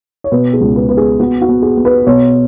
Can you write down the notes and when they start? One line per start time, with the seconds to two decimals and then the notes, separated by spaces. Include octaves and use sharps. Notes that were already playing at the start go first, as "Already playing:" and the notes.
0.24 C#5
0.32 B2 B4
0.53 G#4
0.61 C#2
0.76 B4
0.89 B2 B4
0.97 G#4
1.19 B3 F#4
1.42 F#4
1.49 B3
1.62 G#4
1.77 B3
1.85 B4
2.07 B2 C#5